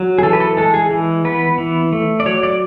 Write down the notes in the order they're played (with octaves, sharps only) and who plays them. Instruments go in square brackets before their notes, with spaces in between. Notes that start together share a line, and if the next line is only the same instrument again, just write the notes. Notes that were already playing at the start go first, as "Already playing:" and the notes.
Already playing: [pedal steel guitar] F#3
G#4
E3 A4
B4
A4
G#3 A4
G#4
E3
B3 B4
E3
A3
D5
F#3 C#5
D5